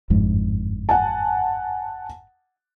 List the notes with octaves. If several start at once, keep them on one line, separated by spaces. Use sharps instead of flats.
G1 F2 G#2
F#5 G#5 A5